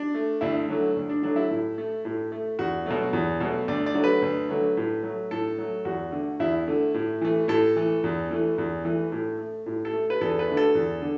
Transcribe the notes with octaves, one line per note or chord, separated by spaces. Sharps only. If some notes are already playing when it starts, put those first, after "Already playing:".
Already playing: D4
A3
D2 E4
D3 F#3 A3
D2
D4
D3 F#3 A3 D4
E4
A2
A3
A2
A3
E2 F#4
B2 F#3 A3
E2
B2 F#3 A3
D2 D5
D5
D3 F#3 A3
B4
D2
D3 F#3 A3
A2
F#3 A3
A2 A4
F#3 A3
E2 F#4
D3 A3
E2 E4
D3 A3
A2
E3 A3
A2 A4
E3 A3
E2
E3 A3
E2
E3 A3
A2
A3
A2
A4
A3
B4
E2 A4
B4
D3 A3
A4
E2
D3